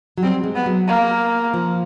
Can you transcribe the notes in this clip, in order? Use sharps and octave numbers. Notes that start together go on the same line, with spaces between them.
F#3
G3 C4
G#3
B3
F#3
A#3
F3